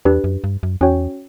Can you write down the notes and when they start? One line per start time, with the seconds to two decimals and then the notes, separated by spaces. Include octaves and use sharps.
0.05 E2 D4 G4 B4
0.24 F#2
0.44 G2
0.63 F#2
0.81 E2 C#4 F#4 C#5 G5